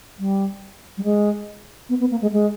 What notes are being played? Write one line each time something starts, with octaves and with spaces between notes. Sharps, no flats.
G3
G3
G#3
B3
B3
A#3
G#3
G#3